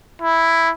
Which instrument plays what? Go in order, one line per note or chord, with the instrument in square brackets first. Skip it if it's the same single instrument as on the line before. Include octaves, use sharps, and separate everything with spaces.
[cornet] E4